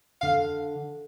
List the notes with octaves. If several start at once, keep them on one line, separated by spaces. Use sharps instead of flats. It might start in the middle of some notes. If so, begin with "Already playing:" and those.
D3 F5